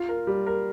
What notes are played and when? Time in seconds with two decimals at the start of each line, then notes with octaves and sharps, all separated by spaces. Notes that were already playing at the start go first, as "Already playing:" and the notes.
Already playing: F4
0.09 A#4
0.27 G3
0.47 A#4